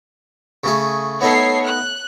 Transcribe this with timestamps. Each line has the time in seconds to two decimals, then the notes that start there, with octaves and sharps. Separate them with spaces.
0.64 C#3 A3 G#4
1.21 A3 B3 D#4 A4 C#5 C7
1.64 F#6